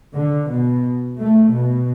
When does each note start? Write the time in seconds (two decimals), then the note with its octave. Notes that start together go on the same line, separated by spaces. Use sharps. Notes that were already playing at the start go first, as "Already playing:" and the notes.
0.14 D3
0.49 B2
1.19 A3
1.53 B2